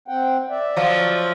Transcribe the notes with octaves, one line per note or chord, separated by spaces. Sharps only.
C4 F#5 G5
D5 E5
F3 F#3